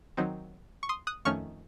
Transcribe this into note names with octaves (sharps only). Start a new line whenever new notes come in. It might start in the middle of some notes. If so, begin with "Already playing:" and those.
D#3 F#3 C4 D#4
C#6
C6 D#6
D#6 F#6
F2 D#3 A3 C#4 C#6 F6